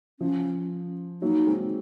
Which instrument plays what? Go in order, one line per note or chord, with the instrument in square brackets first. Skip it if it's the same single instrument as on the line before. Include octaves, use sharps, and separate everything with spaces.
[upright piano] F3 [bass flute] C#4
[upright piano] F#3 A#3 [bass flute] D#4
[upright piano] G#3 C4